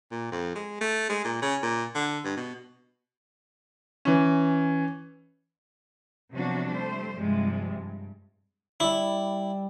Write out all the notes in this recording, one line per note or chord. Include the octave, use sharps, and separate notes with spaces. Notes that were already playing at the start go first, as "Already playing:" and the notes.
A#2
F2
G#3
A3
G#3
A#2
C#3
A#2
D3
G2
B2
E3 C#4
C3 F3 F#3 B3 D4 F#4
G3 A3 C5
G2 C3 F3 G3 G#3
G2
G3 E4 D5